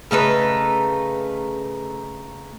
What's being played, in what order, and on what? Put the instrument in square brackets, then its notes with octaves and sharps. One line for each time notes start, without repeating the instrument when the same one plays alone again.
[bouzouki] C#3 A3 D#4 B4